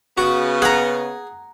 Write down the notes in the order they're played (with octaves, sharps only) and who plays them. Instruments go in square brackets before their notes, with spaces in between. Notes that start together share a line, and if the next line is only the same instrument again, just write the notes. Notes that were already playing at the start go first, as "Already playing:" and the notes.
[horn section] C#3 B3 [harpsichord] F#4
[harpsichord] G#4 [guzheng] F#5 A#5